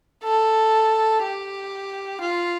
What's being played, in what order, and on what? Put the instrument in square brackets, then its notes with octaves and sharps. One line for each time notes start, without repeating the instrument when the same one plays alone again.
[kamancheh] A4
G4
F4